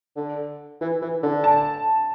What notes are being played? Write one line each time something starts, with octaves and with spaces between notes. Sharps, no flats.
D3
E3
E3
D3
A5